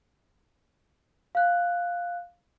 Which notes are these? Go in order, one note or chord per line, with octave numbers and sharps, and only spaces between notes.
F5 F#6